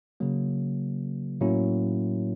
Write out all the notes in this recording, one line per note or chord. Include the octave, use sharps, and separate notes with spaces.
C#3 F#3 A#3
A2 F#3 A#3 C#4 E4